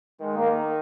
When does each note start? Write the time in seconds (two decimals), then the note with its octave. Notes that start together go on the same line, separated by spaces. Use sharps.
0.21 D#3 G#3
0.34 A#3